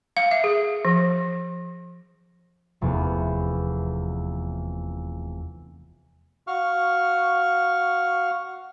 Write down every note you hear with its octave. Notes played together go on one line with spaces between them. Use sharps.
F5
E5
G#4
F3
F1 E2
F#4 F5 C#6 F6